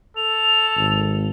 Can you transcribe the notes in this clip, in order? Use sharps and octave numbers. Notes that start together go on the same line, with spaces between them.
A4 F7
G#1